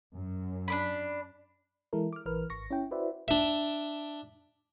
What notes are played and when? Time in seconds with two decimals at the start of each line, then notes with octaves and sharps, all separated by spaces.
0.15 F#2
0.68 D4 D5 B5
1.93 E3 G#3 E4 A4 A#4
2.13 D6 F6
2.26 A#1 E3 A#4 B4 F6
2.50 G#1 C#6 A#6
2.71 C#4 E4 G5
2.91 E4 F#4 B4 C5 D5 E5
3.28 D4 E5